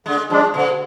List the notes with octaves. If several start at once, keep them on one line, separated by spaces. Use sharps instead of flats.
D3 G#3
F3 G#3 D4
B2 D3